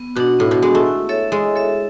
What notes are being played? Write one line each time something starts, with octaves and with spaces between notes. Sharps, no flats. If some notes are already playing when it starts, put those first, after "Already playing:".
Already playing: B3
B2 D4 F#4
A2 B3
B2
G#3 D4 F#4
A3
E4
A4 C#5 E5
G#3 E4
A4 C#5 E5